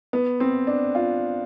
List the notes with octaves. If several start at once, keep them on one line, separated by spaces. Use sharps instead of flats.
B3
C4
D4
F4